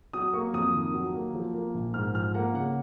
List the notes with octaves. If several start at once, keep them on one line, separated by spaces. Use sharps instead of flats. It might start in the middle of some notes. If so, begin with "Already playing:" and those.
F#3 D#6
A#3 C#6
F2 D#6
D#3
F#3
A#3
F3
A#3
A#1
G#2 F6
F3 F6
A#3 F#5
C#3 F#5